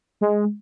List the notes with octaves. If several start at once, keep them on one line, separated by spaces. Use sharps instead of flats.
G#3